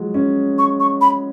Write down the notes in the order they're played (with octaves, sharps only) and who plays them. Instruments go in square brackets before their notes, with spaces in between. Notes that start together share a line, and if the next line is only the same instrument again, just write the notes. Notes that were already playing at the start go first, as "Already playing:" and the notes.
Already playing: [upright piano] F3 F#3 G#3
C#4
[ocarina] C#6
C#6
B5